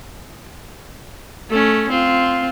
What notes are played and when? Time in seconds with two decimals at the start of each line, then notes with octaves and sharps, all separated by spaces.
1.49 A3 C#4
1.90 C4 F4